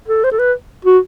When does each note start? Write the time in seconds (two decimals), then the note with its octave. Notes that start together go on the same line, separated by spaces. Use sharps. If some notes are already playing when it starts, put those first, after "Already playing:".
0.09 A4
0.24 C5
0.32 A4
0.39 B4
0.85 F#4